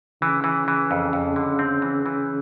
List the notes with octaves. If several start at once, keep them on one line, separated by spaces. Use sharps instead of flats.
C#3 E3
E3
E3
F2
F2
D3
C4
E3
E3